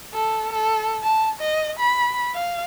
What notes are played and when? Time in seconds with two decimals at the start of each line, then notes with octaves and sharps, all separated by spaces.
0.13 A4
0.53 A4
1.03 A5
1.39 D#5
1.80 B5
2.35 F5